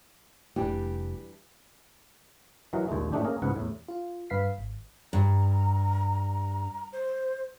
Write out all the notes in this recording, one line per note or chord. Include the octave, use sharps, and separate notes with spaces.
F1 E3 G3 A3 D4 G4
E3 F#3 D#4 F#4 A#4
A#1 D#2 A#2 G#3 A3
A2 F3 A3 D4 D#4 G4
A#3 C#4 G#4 A#4
C#2 G#2 B3 F#5
E2 A2
F4
G2 B4 F5 B6 C7
G#1
G2 A#5
C5